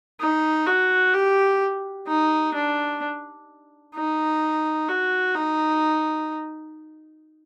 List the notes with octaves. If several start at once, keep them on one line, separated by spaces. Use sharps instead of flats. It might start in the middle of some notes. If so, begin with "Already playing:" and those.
D#4
F#4
G4
D#4
D4
D#4
F#4
D#4